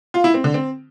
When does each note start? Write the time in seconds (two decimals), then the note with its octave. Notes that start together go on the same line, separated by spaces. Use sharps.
0.14 F4
0.24 E4
0.34 C4
0.44 D3
0.54 C4